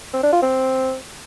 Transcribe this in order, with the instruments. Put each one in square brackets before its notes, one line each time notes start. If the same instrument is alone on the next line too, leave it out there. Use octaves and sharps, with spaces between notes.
[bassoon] C4
D4
F4
C4